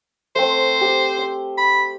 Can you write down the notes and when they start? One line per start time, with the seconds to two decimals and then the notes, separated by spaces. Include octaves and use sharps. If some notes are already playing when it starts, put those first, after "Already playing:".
0.36 A3 C4 C5
0.81 G4
1.18 C6
1.58 B5